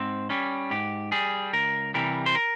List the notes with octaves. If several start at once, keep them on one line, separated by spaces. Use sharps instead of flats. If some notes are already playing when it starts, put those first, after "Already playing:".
Already playing: G#2 C4
G3 C#4
G#2 G4
G3 G#4
C#2 A#4
C3 E3 G3 A#4
C5
A#4